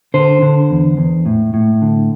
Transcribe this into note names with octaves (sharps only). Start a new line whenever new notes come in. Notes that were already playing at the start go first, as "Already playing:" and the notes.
D3 C5
D3
E2
E2
A2
A2
D3